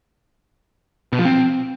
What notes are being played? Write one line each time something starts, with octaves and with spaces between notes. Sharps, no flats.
B2
F3
C4